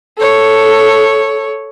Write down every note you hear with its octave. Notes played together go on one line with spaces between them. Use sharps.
A4 C#5